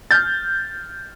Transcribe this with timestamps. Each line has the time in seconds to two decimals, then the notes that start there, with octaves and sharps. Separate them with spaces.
0.11 F6 G6 A6